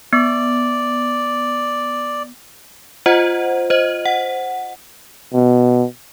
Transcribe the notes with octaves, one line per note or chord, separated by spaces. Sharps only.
B3 D5
F4 C5 D#5 F#5
C5 D#5
F#5
B2